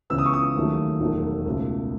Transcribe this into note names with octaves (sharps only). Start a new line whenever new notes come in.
C#2 C#3 E3 B3 E6
D#6
C#6
D#6
D#2 D#3 F#3 A3
E1 D#2 D#3 F#3 A3
C#2 B2 A3